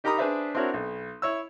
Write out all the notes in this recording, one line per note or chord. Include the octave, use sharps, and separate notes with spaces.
D#4 G4 A#4 A#5 B5 D#6
D4 G#4 B4 C5 D5 E5
C4 D4 E4 F#4 A#4 C#5
B1
E4 C#5 E6